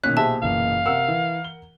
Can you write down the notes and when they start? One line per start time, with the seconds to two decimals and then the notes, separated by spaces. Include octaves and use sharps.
0.04 B1 A#2 D#3 C#4 F#6 B6
0.17 G4 G#4 C5 E5 A5
0.42 F#1 E3 A#3 F5
0.86 C3 A#4 E5 F#5 E6
1.08 E3
1.44 G7